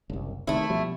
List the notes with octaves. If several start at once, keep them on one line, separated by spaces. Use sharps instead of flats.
F#1 C2
C2 C3 D#3 A3 E4
B2 F3 G3